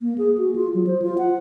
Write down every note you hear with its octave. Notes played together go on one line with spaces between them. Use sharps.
A#3
G#4
F#4
F4
F#3
C5
F4
F#5